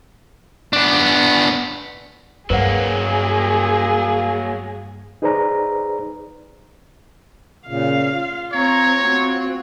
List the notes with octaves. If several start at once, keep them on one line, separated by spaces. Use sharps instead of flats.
B3 D4
G2 F#3 A#3 G#4 B4 C5 F#5
D#4 G#4 B4 C5 D5 A#5
A#2 C#3 F5
F4
C4 C#5 A#5
C4 F#4